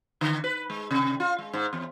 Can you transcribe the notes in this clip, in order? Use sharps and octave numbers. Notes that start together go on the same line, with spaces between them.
D3
B4
G#3
C3
F4
G#3
G#2
E2